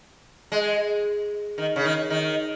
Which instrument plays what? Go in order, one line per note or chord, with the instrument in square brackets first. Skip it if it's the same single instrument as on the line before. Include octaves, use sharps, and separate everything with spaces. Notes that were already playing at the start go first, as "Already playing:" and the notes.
[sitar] G#3
D#3
C#3
D#3
D#3